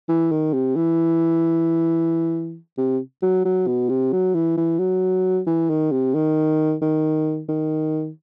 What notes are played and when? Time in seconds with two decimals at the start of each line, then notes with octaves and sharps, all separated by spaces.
0.09 E3
0.31 D#3
0.53 C3
0.76 E3
2.78 C3
3.22 F#3
3.45 F#3
3.67 B2
3.89 C3
4.13 F#3
4.35 E3
4.57 E3
4.79 F#3
5.47 E3
5.70 D#3
5.92 C3
6.15 D#3
6.82 D#3
7.49 D#3